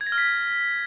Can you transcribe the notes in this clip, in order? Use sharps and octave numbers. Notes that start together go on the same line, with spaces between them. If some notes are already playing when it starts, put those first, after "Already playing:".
G#6
A#6
F6
B6